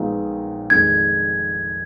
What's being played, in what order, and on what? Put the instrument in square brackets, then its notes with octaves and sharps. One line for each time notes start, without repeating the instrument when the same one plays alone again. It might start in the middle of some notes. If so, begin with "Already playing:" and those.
Already playing: [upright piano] A#1 A#2 G#3 B3 D#4
[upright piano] F1 F2 D#3 G#3 D4 [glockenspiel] G#6